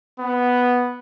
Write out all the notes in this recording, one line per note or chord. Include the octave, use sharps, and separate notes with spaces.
B3